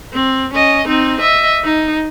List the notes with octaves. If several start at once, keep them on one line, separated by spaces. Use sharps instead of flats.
C4
C#4 D#5
C4 D#4
D#5 E5
D#4